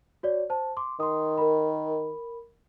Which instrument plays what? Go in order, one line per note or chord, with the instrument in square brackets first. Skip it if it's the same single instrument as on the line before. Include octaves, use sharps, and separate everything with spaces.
[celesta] F#4 C#5 D5
C5 A5
C6 D6
[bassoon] D#3 [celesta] C6 D#6
[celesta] A#4 B5